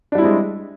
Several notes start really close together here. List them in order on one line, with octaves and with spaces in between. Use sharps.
D4 G3 E4 C4 G#3